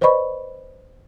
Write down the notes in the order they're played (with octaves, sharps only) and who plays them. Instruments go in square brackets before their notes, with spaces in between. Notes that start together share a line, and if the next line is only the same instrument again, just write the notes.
[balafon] B4 C5 D5 D#5 B5 C#6